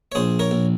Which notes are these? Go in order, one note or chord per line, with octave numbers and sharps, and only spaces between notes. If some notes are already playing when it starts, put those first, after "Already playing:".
C#5
A#1 G#4 C5
A#4 C#5
A#1